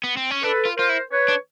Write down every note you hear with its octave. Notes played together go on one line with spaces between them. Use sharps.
B3
C4
C#4
D4 A4 B4
F4
F4 A#4 C5
E4
B4 C#5
D4